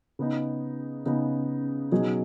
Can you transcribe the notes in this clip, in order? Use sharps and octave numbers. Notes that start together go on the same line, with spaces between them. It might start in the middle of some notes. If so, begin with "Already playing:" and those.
C#3 B3 D#4
C#3 B3 D#4
B2 F#3 D#4 G#4